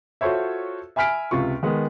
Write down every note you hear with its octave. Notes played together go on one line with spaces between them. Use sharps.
F4 F#4 A4 C5 C#5 E5
E5 G#5 B5 F6 B6 D7
C#2 C3 F4 C#6
D#3 G#3 B3